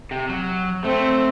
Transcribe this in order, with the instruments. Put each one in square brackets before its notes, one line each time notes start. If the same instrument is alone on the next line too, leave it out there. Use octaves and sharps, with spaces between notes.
[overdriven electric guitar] C3
F#3
[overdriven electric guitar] A3 [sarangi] C4